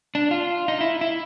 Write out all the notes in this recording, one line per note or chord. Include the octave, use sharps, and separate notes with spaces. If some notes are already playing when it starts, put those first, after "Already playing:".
D4
F4
D#4
E4
E4